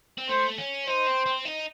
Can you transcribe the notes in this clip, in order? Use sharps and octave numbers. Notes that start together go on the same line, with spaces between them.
C4
A3 C5
C#4
D#4 C5
C4
C4
D#4